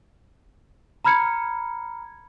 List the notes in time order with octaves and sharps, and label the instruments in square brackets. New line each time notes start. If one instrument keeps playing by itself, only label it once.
[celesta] A#5 B5 F6 G#6 C#7